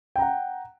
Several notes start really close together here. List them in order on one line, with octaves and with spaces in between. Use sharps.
G5 A#5 F#5